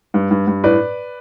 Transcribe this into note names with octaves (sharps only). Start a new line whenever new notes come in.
G2
G2
G2
A2 B4 D5